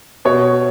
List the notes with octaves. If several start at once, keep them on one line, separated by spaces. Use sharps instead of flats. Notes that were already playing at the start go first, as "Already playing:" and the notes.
B2 C#5